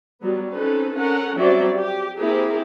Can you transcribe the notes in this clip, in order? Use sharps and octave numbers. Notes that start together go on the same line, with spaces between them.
F#3 G3 B3
C4 C#4 D#4 A4 B4
C#4 A4 A#4 F#5
F#3 G3 C4 C#4 D5 E5
G4
A#3 C4 E4 G4 G#4 A#4